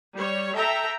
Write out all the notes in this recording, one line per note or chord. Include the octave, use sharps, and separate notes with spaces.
G3 C#5
A4 E5 G5 A#5